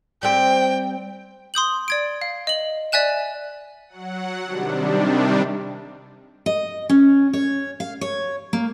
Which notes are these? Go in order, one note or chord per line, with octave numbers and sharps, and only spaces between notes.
G3 C4 G5
C6 D#6 G6 F#7
D5 G#6 D7
F5
D#5 F#7
D5 E5 G#5 F#6 E7
F#3 F#5
C3 D#3 G3 D4
D#5
C#4
C#5
F5
C#5
A#3